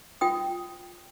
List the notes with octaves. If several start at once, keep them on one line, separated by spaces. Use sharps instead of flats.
F4 G5 D#6